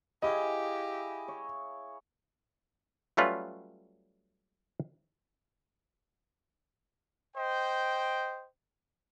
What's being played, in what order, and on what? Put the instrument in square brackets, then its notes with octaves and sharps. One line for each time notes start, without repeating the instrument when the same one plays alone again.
[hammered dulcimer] E4 G#4 F5 [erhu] G4 [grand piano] D#5
[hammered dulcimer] C#5
[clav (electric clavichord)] F#3 G3 A3 C#4 F4 B4
[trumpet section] C5 D#5 G5